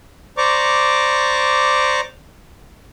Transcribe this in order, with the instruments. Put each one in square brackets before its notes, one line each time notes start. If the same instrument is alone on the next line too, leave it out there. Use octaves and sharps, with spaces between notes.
[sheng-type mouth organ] C5 D5 A#5 C#6 D6